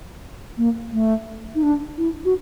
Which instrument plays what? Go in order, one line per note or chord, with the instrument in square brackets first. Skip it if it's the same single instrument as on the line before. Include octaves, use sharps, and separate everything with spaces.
[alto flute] A#3
A3
D#4
D4
E4
F#4